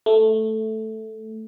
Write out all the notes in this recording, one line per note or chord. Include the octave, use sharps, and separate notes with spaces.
A3